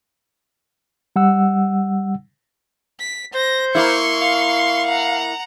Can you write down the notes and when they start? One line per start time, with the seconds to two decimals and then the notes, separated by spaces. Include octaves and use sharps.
1.16 G3 F#5 E6
2.99 B6
3.34 C5 A#6
3.75 A#3 E4 C6 C#6
4.22 F5
4.87 F#5 A#5